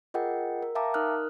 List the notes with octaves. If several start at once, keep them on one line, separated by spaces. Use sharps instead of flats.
F4 G#4 A#4 D#5 F#5 G5
A#4
E5 F5 G5 A5 A#5 D6
D#4 A#4 D#6 F6 F#6